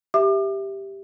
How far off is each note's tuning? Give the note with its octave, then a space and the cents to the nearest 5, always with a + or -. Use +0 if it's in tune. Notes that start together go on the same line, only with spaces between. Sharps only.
G4 +0 E5 +0 D6 +35